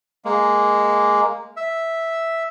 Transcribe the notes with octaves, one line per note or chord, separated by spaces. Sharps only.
G#3 A#3
E5